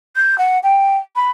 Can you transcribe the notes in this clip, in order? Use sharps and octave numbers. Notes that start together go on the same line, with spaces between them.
G6
F#5
G5
B5